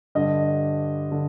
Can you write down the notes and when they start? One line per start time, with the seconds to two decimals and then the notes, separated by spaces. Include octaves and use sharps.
0.15 G2 D3 D#5
1.12 D3